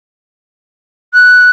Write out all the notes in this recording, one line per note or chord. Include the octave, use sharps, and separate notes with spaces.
F#6